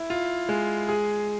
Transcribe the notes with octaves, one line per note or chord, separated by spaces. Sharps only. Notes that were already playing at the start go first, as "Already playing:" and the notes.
Already playing: E4
F4
G#3
G#4